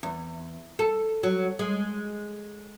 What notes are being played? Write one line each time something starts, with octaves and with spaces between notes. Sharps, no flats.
E2
A4
F#3
G#3